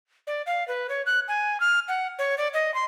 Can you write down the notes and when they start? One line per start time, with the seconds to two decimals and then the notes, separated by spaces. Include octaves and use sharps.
0.27 D5
0.46 F5
0.68 B4
0.89 C#5
1.06 F#6
1.28 G#5
1.60 F6
1.88 F#5
2.19 C#5
2.38 D5
2.54 D#5
2.74 C6